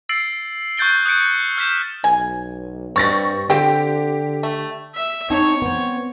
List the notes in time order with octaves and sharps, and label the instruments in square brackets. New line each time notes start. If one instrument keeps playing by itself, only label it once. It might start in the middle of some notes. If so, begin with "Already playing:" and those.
[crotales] E6 A6 C7 D7 F#7
C#6 F#6 G6 A6 D7 G7
D#6 F#6 G6 C#7 D7
F6 G6 B6 E7
[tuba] B1 [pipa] G#5
[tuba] G2 [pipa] B2 C4 [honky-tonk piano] C#6 A6 A#6
[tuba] D3 [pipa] C4 F4 G5 [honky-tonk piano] G4
[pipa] A3
[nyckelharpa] E5
[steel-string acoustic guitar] C4 D#4 A5 [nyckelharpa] C#5
[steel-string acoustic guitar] B3 C4